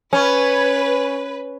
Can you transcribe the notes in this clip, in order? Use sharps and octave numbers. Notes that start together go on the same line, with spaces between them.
C#4 B4